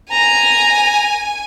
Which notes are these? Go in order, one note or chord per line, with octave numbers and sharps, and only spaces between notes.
G#5 A#5